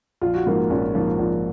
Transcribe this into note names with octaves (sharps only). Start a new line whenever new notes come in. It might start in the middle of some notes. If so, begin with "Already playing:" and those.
A#1 F4
F#4
G#2 F3 A#3 F4
A#1 C#4
G#2 F3 A#3
A#1